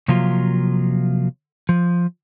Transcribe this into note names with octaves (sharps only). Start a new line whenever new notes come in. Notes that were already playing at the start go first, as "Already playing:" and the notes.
C3 F3 F#3 A#3 F4
F3